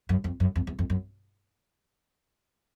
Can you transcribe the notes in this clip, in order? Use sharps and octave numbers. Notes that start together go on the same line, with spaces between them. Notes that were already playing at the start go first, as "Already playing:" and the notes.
F#2
F2
F#2
F2
E2
F2
F#2